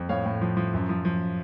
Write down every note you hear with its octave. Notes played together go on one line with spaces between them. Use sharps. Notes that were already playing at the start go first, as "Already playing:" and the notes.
Already playing: F2
A2 C#5 F5
A2
F3
F3
F#2
F3
F3